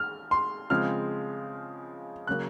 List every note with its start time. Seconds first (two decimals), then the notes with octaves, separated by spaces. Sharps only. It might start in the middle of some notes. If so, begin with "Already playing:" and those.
Already playing: F6
0.31 C6
0.70 C#3 F3 G#3 C4 F6
2.27 C#3 F#3 A#3 F#6